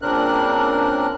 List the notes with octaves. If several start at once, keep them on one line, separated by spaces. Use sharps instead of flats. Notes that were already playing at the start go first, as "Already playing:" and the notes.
A#2 C#3 C4 D4 A#4 F#6